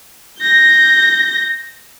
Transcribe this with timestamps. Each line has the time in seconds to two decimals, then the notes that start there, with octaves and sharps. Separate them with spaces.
0.41 G6 A#6